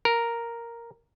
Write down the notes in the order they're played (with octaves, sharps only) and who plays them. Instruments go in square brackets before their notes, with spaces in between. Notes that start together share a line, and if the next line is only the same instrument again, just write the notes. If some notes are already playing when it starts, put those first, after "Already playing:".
[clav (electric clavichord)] A#4